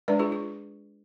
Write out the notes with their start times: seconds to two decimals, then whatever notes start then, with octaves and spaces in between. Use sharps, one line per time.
0.08 G#3 D4 B4 D5
0.19 F4 G#4
0.32 F4